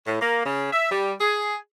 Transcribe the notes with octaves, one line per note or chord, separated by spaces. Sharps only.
A2
A#3
C#3
E5
G3
G#4